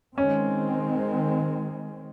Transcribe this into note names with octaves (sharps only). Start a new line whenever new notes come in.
D#3 G#3 C4 C#4